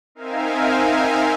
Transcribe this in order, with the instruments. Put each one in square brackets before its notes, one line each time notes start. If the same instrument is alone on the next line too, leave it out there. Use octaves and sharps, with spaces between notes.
[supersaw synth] C4 D#4 A#4 E5 F5 G#5